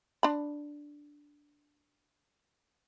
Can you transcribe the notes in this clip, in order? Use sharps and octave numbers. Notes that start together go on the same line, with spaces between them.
D4 B5